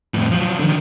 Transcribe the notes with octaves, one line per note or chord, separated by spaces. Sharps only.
F2 A2
F3 F#3
D3 D#3